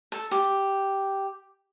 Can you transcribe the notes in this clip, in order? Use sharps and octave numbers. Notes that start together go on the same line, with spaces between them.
A4
G4